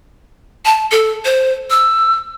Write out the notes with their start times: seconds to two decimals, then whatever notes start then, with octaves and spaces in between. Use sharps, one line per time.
0.65 A5
0.91 A4
1.25 C5
1.70 E6